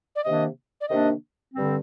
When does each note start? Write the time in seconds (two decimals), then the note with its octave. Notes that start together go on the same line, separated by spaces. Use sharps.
0.16 D5
0.24 C3 D#3 A#3 D4 D#5
0.81 D5
0.88 C3 D#3 A#3 D4 D#5
1.54 G2 D3 G3 C4